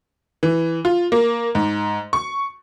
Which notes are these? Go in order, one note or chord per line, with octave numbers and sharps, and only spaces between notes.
E3
F4
A#3
G#2
C#6